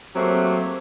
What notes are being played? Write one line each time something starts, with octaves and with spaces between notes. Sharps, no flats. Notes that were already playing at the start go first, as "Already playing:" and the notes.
F#3 A3 A#3 C4 G4